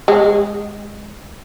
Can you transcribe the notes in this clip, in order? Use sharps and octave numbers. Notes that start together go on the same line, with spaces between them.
G#3